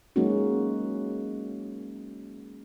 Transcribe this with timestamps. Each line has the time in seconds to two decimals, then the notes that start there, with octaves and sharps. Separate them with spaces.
0.16 F#3 G#3 A#3 C#4 D#4 F#4